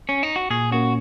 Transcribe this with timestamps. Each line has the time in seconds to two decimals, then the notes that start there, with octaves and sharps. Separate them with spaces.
0.09 C#4
0.23 D#4
0.36 F#4
0.50 A#2 G#4
0.71 A#3 C#4 F#4